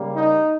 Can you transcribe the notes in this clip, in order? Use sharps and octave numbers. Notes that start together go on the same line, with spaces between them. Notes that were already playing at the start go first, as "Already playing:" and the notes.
Already playing: C#3 G3 A#3
D#4